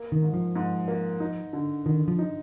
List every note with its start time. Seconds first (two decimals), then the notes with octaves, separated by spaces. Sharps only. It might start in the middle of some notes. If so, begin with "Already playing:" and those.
Already playing: A#3
0.12 D#3
0.22 G#2
0.34 F3
0.56 G#2
0.88 A#3
1.20 D#4
1.53 D3
1.86 D3 D#3
2.08 F3
2.19 D#4